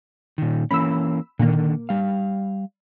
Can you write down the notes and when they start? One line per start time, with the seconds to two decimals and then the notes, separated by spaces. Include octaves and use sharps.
0.38 A#2 D#3
0.71 E3 A#3 C#4 B5 E6
1.39 A#2 D3 D#3 A#3
1.89 G3 F5